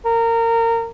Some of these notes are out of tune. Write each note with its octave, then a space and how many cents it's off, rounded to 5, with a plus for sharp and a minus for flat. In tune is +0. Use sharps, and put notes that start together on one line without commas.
A#4 -25